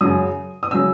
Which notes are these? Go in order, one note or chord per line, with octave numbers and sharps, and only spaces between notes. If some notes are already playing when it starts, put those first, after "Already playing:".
F#2 C#3 F#3 D#6
D#6
C#3 F#3 E6